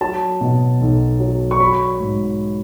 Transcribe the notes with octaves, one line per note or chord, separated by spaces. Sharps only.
F#3 A5
B2
B1
F#3
C#6
F#3 B5
G#2